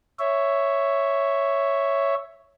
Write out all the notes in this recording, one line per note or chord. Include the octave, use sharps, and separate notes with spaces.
C#5 E5